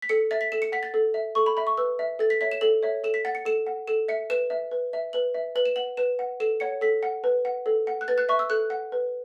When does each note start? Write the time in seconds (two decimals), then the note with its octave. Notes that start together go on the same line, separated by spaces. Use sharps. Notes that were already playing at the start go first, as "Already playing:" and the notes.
0.02 B6
0.09 A4 C#7
0.31 E5 A6
0.41 B6
0.52 A4 E7
0.62 C#7
0.72 F#5 B6
0.83 A6
0.94 A4
1.14 E5
1.35 A4 C#6
1.46 B5
1.57 E5 B5
1.67 C#6
1.78 B4 E6
1.99 E5
2.19 A4 A6
2.30 B6
2.41 C#5 E5 B6
2.52 E7
2.61 A4 F#7
2.83 C#5 E5
3.04 A4 E7
3.14 B6
3.25 F#5 A6
3.35 C#7
3.45 A4 E7
3.67 F#5
3.88 A4 E7
4.08 E5 C#7
4.30 B4 E7
4.50 E5
4.71 B4
4.93 E5
5.13 B4 F#7
5.34 E5
5.55 B4 F#7
5.66 E7
5.76 F#5 F#7
5.97 B4 E7
6.19 F#5
6.40 A4 E7
6.60 C#5 F#5 C#7
6.81 A4 B6
7.03 F#5
7.24 B4
7.45 F#5
7.66 A4
7.87 F#5
8.01 F#6
8.08 B4 A6
8.18 F#6
8.29 E5 C#6
8.39 E6
8.50 A4 F#6
8.70 F#5
8.92 B4